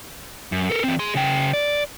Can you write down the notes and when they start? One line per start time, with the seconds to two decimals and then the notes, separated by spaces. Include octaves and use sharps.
0.52 F#2
0.70 A4 A#4
0.84 E3 C4
0.99 G#4 C6
1.15 C#3 G5
1.53 D5